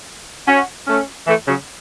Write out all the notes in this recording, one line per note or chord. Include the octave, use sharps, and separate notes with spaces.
C#4 F#4
A3 C#4
E3 A3
C#3 F#3